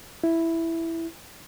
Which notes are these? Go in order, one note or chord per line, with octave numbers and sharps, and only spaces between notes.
E4